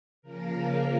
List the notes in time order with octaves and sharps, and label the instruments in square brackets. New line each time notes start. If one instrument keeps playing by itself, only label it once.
[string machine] C#3 F3 A#3 A#4